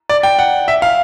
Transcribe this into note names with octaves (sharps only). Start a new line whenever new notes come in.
D5
G5
F#5
E5
F5